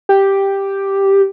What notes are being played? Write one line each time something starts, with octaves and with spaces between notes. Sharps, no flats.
G4